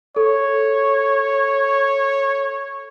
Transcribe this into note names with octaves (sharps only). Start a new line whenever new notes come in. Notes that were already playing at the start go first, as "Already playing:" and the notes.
A4 C#5